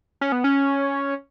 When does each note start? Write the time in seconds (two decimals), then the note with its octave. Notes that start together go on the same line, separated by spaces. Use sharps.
0.21 C#4
0.32 B3
0.44 C#4